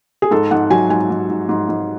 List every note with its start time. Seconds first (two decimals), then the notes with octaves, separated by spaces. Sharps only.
0.22 G#4
0.31 G#2 A4
0.51 G#2 F#5
0.70 F#3 G#5
0.90 G#2 G#5
1.10 G#2
1.30 G#2
1.49 G#2
1.69 G#2